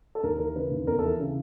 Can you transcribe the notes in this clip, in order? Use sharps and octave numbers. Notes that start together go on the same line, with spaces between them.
A4
D#2 A#4
E3 A#4
C#3 B4
D#2
E2 A#4
A4
E3
C#3